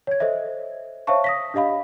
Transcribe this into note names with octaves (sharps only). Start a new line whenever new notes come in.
C#5 G#6
A4 C5 D#5 E5
C5 C#5 E5 F5 A5 C#6
D#6 A#6 B6
D4 G4 D#5 F5 B5